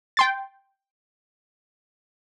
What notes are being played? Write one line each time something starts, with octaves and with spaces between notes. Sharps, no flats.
G5 C6 A6